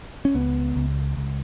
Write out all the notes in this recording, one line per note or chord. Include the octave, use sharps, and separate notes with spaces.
C#4
C#2 B3
C#2
C#2